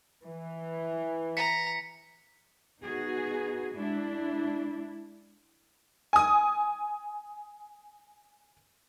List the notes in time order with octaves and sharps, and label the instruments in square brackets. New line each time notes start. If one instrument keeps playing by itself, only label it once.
[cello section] E3
[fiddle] A#5 [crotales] B6 C#7
[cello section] B3 D#4 F#4 G#4
G#3 D4 E4
[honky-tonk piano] G#5 D#6